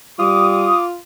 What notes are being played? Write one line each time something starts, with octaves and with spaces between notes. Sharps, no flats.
G3 F4 D6 D#6